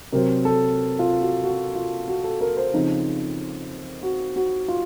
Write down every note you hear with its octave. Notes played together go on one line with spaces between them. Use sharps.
C3 F#3 C4 A#4
A4
F4
F#4
F#4
F4
F#4
A4
A#4
C5
C#3 F3 C4 D#4
F#4
F#4
F4